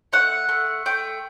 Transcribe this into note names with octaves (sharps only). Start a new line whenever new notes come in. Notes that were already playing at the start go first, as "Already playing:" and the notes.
A3 F#5
A3
A3 G5